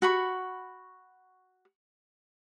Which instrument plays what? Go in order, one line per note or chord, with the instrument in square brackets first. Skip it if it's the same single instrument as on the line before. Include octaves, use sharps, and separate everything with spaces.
[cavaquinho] F#4 B5 C#6